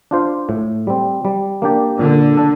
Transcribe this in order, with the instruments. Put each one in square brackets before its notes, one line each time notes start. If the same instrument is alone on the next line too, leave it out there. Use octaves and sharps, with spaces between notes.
[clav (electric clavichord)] D4 F4 C5 F5
A2
G3 C4
G3
A#3 D4 G4 D5
[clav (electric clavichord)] A#2 [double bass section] D3
[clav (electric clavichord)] D4 A4